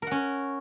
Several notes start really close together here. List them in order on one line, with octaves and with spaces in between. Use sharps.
A#4 F#5 C#4